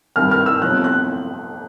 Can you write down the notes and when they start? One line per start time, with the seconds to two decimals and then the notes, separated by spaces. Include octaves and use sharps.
0.16 G#1 G2 D#3 F6
0.31 F6
0.46 E6
0.61 G1 F2 C3 F3 F#6
0.84 F#6